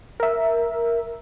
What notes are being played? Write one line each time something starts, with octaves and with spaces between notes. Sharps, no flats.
A#4 E5